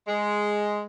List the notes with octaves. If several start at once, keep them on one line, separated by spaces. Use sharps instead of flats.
G#3